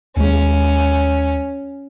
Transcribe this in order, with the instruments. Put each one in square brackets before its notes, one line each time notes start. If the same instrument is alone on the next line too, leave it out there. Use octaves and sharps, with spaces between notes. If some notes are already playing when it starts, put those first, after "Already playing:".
[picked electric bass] D#2 G#3 [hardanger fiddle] C#4